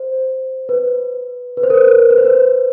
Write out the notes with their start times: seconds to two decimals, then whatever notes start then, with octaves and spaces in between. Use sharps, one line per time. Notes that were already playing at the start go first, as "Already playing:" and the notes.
Already playing: C5
0.69 B4
1.57 B4
1.63 C5
1.70 A#4
1.75 B4
1.87 B4
1.98 A#4
2.11 B4
2.18 C5
2.25 B4